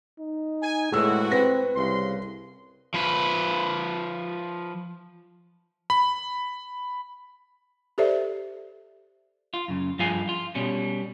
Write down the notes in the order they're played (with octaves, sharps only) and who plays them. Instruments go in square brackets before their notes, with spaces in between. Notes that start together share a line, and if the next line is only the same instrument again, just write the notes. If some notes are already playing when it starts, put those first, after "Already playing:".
[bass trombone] D#4
[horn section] G#5
[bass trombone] A2 [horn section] C3 E3 F#4 [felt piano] G#3 E6
[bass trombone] C4 [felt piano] B4 A#6
[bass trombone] C2 [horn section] C#3 C6
[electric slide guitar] F3 B4
[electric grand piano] B5
[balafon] G4 A4 C5 D5 E5
[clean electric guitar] F4
F#2 C#3
G2 F3 F4 G#4 F5 G#5
F4
B2 G3 C#4